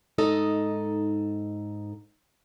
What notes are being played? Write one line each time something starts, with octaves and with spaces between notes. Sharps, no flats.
G#2 D#4 A4 D#5